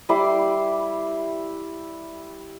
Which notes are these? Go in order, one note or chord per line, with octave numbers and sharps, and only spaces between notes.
G3 E4 C6 D6